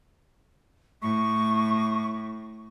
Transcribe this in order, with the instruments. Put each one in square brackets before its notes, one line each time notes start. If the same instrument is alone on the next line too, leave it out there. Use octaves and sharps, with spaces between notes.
[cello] A2 [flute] C#6